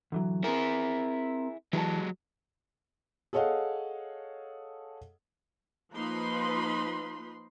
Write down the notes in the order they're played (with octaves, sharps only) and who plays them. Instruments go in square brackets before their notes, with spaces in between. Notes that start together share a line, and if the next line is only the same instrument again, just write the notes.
[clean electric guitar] D2 E3 F#3
[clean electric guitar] C4 A#4 [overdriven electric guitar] E4 G#4
[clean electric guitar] E3 A5 [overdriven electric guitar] F#3 G#3
[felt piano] G#4 A4 C#5 D#5 F5 F#5
[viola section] F3 A#3 D#4 B4 B5 C6